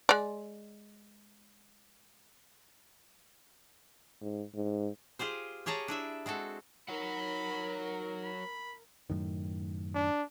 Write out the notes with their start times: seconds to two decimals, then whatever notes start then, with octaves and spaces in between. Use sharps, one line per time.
0.09 G#3 D5
4.21 G#2
4.55 G#2
5.19 F4 G4 G#4 C5
5.66 G4 G#4 C#5 A5 A#5
5.88 D4 E4 E5
6.26 G#3 C4 F#4 A4
6.89 F#3 D#4 A#4 C#5 F#5 B5
8.24 B5
9.10 F#2 A2 D#3
9.94 D4